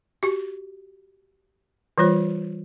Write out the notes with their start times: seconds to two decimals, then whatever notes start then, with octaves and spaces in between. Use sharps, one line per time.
0.23 F#4 G4
1.98 E3 G3 F4 C5